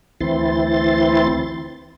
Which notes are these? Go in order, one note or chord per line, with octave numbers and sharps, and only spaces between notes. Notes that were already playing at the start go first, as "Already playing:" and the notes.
D2 E3 C4 E4 C6 A6